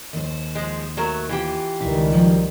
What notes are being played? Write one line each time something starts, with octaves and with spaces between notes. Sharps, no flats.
D#2 C5
F3 G#3
F#3 A3 A#4
E3 F4 G4
C#2 D#3 G3 E4
F3 F#3